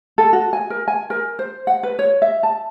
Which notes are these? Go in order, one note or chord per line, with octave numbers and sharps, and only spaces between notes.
A4
F#4
G#5
A#4
G#5
A#4
C5
F#5
B4
C#5
E5
A5